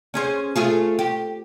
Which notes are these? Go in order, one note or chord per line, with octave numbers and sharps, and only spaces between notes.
C#4 G#4 C5
A3 F4 G#4
G4